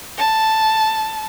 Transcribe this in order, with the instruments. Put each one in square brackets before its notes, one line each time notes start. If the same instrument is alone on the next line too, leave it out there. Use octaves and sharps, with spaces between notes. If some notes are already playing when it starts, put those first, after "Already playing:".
[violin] A5